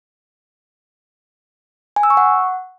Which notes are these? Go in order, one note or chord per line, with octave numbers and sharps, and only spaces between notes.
G#5
E6
C#6
F#5